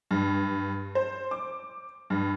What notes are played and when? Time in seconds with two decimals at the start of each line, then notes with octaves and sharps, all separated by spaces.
0.11 G2
0.95 C5
1.31 D6
2.10 G2